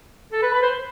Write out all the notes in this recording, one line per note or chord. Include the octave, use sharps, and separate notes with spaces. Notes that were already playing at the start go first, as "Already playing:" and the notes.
A4
B4
B4
C5